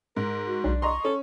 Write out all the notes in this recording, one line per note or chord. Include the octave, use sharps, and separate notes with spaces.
G#2 A#4
F#4
B1 D4
D#5 A#5 C6 C#6
C#4 A4